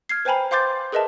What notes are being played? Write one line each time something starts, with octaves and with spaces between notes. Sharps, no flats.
F6 G#6 C7
B4 C5 G5 G#5 A#5 B5
C5 F5 C6 D6 G6 A6
G#4 A#4 B4 D#5 E5 A5